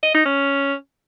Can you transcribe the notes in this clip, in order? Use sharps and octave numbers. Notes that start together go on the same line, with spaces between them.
D#5
D#4
C#4